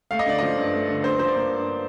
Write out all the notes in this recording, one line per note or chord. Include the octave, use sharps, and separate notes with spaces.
A3 F5
D#5
D3 D5
F3 D#5
G2
A3
D3
G2 C5
F3 C5
D5
A#3
G2